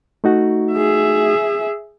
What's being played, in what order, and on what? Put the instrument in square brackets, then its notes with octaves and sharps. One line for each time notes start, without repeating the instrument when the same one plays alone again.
[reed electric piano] A3 D#4 F#4
[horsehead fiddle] G#4 E5